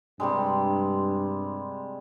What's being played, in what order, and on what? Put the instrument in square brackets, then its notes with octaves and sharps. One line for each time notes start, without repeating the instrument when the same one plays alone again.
[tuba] G2 [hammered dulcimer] C3 G3 G#3